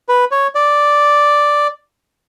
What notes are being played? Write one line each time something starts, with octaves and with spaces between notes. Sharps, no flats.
B4
C#5
D5